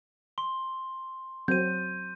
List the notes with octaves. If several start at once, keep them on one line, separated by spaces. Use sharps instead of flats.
C6 G7
F#3 C4 G6 D#7